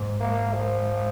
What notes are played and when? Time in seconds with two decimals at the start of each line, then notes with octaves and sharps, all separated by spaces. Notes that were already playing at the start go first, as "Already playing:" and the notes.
Already playing: G#2
0.20 A#3
0.53 F3